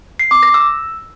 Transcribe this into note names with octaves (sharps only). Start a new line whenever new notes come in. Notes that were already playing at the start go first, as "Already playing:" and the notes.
C7
D6
A#6
E6